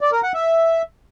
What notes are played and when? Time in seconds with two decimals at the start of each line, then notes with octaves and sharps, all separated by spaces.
0.01 D5
0.12 A#4
0.23 F#5
0.34 E5